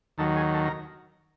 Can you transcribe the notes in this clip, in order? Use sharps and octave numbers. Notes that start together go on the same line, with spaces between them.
D#2 D#3 F#3 A4
G#4
A4
A#4